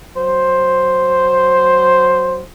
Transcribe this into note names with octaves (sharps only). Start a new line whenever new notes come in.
F#3 C5